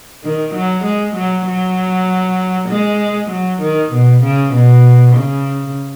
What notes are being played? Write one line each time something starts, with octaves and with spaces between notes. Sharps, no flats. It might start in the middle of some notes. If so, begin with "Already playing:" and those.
D#3
F#3
G#3
F#3
F#3
G#3
F#3
D#3
B2
C#3
B2
C#3